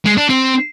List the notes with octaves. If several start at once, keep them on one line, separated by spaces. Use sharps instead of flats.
G#3
D4
C4